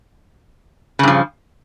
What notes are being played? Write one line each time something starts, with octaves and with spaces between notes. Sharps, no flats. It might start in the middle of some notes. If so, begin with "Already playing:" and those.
G2 C#3 F3